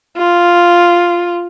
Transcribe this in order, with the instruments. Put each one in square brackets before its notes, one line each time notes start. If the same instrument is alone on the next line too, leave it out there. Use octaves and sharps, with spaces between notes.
[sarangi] F4